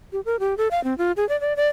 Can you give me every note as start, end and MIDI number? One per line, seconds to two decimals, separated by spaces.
0.12 0.21 67
0.25 0.39 70
0.40 0.57 67
0.58 0.68 69
0.71 0.83 77
0.84 0.96 60
0.98 1.12 65
1.17 1.27 68
1.29 1.39 74
1.41 1.56 74
1.57 1.67 74